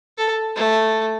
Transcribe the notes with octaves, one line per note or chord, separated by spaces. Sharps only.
A4
A3